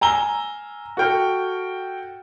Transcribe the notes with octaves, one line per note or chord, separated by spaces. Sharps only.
G#5 A#5 E6 G7
F#4 A4 G5 F6